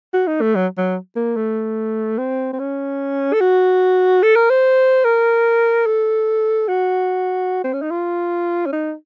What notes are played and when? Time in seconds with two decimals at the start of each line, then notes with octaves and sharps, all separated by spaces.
0.14 F#4
0.27 D#4
0.41 A3
0.55 F#3
0.78 F#3
1.16 A#3
1.36 A3
2.18 C4
2.53 C4
2.59 C#4
3.33 A4
3.41 F#4
4.23 A4
4.36 A#4
4.50 C5
5.05 A#4
5.86 A4
6.68 F#4
7.64 C4
7.73 C#4
7.82 D#4
7.91 F4
8.66 C#4
8.73 D#4